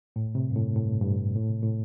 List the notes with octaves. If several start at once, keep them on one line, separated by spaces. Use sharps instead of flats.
A2
C3
G2
A2
A2
G2
G2
A2
C3
A2